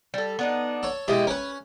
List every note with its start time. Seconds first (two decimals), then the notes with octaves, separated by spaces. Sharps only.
0.14 G3 A4
0.39 B3 D4 D#4
0.83 A4 C#5
1.08 B2 G#3 E4 G4 D#5 G5
1.27 C#4 A#4 B4 C#5